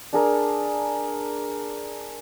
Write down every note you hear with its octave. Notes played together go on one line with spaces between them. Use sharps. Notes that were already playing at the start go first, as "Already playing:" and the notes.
D4 G#4 A#4